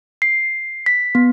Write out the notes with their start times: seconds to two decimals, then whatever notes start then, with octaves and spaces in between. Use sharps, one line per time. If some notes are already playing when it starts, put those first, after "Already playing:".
0.22 C7
0.86 B6
1.15 B3